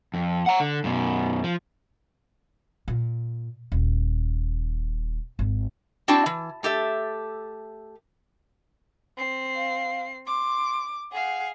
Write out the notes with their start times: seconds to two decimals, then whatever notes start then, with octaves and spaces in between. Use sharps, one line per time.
0.14 F2
0.46 F#5 A#5
0.60 D3
0.84 F#2 B2
1.44 F3
2.88 A#2
3.72 D#1
5.39 G#1
6.08 C4 D4 E4 F#4 G5 A5
6.26 E3
6.63 A3 G4 A4 E5
9.17 C4 C7
9.55 F5
10.27 C6 D6
11.12 G#4 F5 F#5